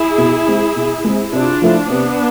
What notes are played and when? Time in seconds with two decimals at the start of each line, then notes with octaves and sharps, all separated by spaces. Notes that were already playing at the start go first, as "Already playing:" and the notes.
Already playing: E4 G#4
0.18 B2
0.47 G#3 C4
0.76 B2
1.04 G#3 C4
1.33 C3 D4 F4
1.62 F3 A3 E4
1.90 C3 B3 D4